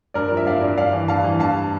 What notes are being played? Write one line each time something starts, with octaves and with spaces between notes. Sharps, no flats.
G2 A#4 D5
F3
E5
G2 D5 F5
G2
G2 D5 F5
E3
G2 F5 A5
E3
G2 F5 A5